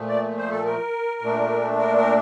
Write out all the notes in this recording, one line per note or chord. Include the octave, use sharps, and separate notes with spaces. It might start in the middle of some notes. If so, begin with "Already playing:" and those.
Already playing: A#2 F3 A3
D5
C5
A4
A#4
A#2 A3 D4
A#4
A#4